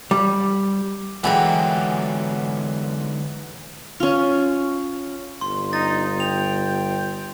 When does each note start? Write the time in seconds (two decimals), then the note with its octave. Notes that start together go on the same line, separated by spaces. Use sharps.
0.11 G3
1.24 G#2 D3 E3 F#3 F#4 G#4 G5
4.00 C#4 F4
5.41 G1 C6
5.73 D#4 A6
6.20 G5 F7